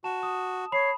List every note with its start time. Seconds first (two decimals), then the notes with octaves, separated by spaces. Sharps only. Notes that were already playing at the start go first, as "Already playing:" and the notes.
0.04 F#4 A5 E7
0.23 D#6
0.72 C#5 B5 C7